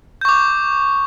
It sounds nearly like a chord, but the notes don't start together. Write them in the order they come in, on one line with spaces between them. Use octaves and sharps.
G6 C#6 D6